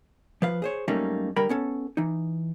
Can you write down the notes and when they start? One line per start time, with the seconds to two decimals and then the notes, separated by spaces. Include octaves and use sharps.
0.42 F3 B4 F5
0.62 G#4 C5 C#5
0.88 F#2 G3 A3 A#3 C#4 D#4
1.36 D3 G3 A#4 G5 B5
1.49 B3 C#4 A4
1.97 E3 D#4